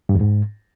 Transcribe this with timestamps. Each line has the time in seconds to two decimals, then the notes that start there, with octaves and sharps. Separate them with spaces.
0.09 G2
0.15 E2
0.21 G#2